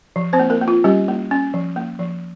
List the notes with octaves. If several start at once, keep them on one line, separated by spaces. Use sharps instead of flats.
F3
C4 C5
A#3
A#3 A#4
A#3
F4
G3 C#4 G4
A#3
C#4
F3
A#3
F3